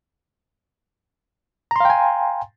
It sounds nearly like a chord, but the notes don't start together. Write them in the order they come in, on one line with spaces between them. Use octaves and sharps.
A#5 C6 F5 G5 G#5